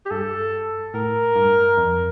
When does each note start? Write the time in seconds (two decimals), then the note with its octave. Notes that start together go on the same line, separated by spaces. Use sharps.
0.06 G4
0.11 G2 A4
0.94 A2 A#4
1.36 G2
1.78 F2